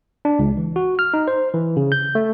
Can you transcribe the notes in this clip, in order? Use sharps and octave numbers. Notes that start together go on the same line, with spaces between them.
D4
C#2
E3
F#4
F6
D#4
C5
E3
C#3
G6
A3